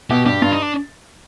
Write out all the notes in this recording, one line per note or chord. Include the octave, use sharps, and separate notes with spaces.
B2 G4
G2 G4
G2 F4
D#4
D4